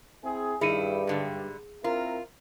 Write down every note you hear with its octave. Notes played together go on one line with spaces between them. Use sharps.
C4 E4 G#4
G2 D#3 E4 G#4 C#7 D#7
G#2 D3 G3
C4 E4 F4 A#4